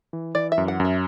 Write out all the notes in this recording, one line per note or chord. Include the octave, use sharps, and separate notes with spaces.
E3
E3 D5
E5
F#2
F#5
F#2
E5